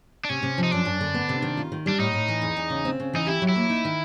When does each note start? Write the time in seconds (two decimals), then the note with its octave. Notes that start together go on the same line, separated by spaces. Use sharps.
0.25 D4
0.29 C3 C#4
0.43 C3
0.58 F3
0.63 D#4
0.71 F#2 D4
0.85 F#2
1.01 D3
1.14 B3
1.29 C3
1.42 D#3
1.57 F4
1.72 D#3
1.86 G3 D4
1.99 A2 D#4
2.13 A2
2.28 E3
2.42 E2
2.57 E2
2.70 C#3
2.85 C4
3.00 C#3
3.13 E3 D#4
3.27 E4 G4
3.42 F#3
3.49 E4
3.56 A#3
3.70 D#4
3.85 D#3